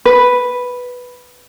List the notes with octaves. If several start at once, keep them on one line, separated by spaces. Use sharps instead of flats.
B4